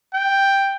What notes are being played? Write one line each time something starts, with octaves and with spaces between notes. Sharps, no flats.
G5